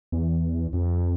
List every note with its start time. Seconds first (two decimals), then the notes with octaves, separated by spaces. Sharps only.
0.12 E2
0.73 F2